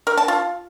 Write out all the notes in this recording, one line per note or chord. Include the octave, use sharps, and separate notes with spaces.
A#4
A5
F4